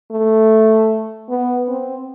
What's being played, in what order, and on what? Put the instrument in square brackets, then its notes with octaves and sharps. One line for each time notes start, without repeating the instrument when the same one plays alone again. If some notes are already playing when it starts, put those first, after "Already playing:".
[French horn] A3
B3
C4